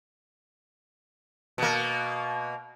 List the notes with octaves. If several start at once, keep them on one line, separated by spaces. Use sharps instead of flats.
B2 A#3